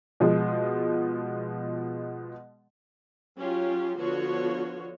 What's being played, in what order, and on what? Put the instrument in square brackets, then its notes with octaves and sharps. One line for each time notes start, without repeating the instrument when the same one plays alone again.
[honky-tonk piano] B2 F3 G#3
[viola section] F#3 C#4 F4 G4
D3 F3 B3 F4 F#4 C#5